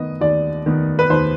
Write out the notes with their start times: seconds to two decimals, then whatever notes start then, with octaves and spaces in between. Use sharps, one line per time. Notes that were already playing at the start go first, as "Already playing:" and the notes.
Already playing: D#3 B3 D#5
0.21 D#2 D5
0.66 D#3 B3
0.99 B4
1.10 D#2 C5